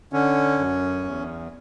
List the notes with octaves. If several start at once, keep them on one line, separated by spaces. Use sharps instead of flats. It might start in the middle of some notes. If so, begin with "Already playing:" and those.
D3 C#4
F#2
E2